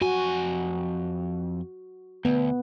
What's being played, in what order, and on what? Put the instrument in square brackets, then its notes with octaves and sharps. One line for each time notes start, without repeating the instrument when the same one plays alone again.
[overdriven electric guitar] F2 G#5 [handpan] F#4
[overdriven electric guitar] D2 [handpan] B3